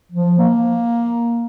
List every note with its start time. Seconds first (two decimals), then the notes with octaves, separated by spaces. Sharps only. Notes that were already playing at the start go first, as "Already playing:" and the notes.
0.12 F3
0.38 A#3